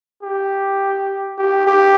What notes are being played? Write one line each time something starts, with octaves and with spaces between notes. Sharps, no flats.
G4
G4
G4